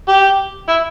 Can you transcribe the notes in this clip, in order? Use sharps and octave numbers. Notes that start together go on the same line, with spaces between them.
G4
E4